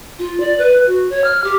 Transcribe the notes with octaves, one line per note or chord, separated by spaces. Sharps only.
F4
D5
B4
F#4
C#5
F6
G4